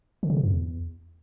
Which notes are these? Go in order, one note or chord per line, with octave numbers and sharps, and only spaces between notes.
D3
C#3
C3
F#2
E2